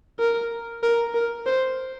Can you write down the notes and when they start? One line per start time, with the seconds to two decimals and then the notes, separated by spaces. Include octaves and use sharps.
0.19 A#4
0.83 A#4
1.14 A#4
1.46 C5